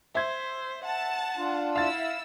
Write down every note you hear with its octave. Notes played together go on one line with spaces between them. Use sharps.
C5 E5 G#6
F#5 A5
D4 F4
E4 F5 E6 A6